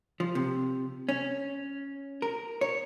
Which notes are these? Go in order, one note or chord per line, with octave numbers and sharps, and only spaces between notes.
F3
C3
C#4
A#4
C#5